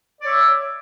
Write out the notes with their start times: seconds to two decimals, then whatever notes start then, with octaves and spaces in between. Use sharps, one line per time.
0.21 D5
0.24 C#5
0.26 E5